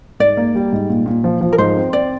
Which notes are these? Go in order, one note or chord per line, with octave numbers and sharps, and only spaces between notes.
G#2 D5
A#3
G3
G#2
A#2
A#2
F3
F3
A#4
G#2 C5
C4
C4 D5